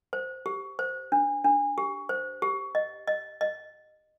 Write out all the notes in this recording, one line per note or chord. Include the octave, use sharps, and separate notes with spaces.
C5
G4
C5
D4
D4
G4
C5
G4
D#5
D#5
D#5